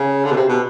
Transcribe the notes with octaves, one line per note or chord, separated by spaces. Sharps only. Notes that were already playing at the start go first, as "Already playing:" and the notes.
Already playing: C#3
D3
B2
C3
B2